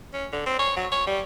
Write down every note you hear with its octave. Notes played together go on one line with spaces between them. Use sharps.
C#4
D3
C4
C#5
F#3
C#5
G3